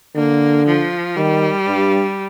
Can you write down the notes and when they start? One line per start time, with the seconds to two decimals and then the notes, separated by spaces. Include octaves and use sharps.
0.16 D3 A#3
0.67 F3
1.17 D#3 G3
1.68 G2